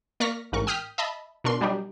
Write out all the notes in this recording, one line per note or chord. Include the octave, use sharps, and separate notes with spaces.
A#3 D5 C#6 F6 A#6 B6
A1 G#2 A#4 C#6
G5 D#6 F6 G6 B6
D#5 E5 A5 B5
B2 D4 A#4 C6
F#3 G3 D4 D#4 G4